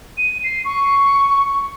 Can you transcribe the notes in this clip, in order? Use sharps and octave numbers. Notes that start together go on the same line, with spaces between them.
D#7
C7
C#6